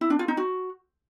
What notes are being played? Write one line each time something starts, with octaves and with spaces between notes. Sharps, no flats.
E4
D4
F4
D#4
F#4